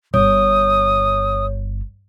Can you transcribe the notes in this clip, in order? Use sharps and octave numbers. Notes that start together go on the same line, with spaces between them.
G1 C#5 D#6